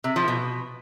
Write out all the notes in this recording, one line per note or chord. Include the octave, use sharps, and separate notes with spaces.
C3
F3
B2